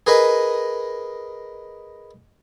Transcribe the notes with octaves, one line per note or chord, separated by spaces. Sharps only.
G#4 A#4 B4 D#5 G#5